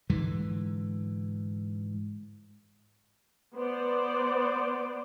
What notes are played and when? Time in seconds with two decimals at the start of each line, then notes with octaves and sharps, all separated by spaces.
0.10 G#2 D3 E3
3.56 B3 C5 D5